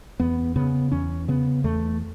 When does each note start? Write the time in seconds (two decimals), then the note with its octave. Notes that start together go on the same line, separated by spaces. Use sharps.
0.20 E2 B3
0.56 C#3 B3
0.91 E2 C#4
1.28 C#3 B3
1.64 E2 A3